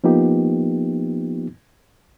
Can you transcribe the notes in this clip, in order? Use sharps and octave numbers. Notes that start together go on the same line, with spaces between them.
F3 A#3 B3 D#4 F4 G4